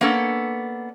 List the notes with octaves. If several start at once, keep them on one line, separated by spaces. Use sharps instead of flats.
A#3 B3 C#4 D4 A4